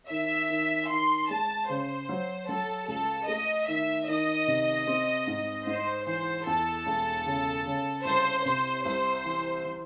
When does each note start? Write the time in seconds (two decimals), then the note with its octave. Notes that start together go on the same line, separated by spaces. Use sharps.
0.10 D#3 E5
0.50 D#3
0.89 D#3 C6
1.30 G#3 A5
1.69 C#3 C5
2.09 F#3
2.49 F#3 A4
2.88 C#2 A4
3.28 A3 D#5
3.67 D#3 E5
4.08 D#3 D#5
4.47 C3
4.87 C4
5.27 G#2
5.66 G#2 C5
6.06 E3 C5
6.46 E2 A4
6.86 E1
7.26 C#3
7.66 C#3
8.05 C2 C5
8.45 C3 C5
8.85 C2 C5
9.25 E3
9.64 E3